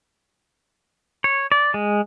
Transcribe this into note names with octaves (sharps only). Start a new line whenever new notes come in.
C#5
D5
G#3